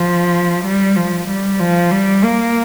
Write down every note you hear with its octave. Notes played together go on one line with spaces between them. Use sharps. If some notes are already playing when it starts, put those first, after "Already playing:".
Already playing: F3
G3
F3
G3
F3
G3
A#3